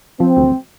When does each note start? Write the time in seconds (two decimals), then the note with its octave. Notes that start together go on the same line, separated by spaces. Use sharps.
0.20 F3 C4
0.37 D2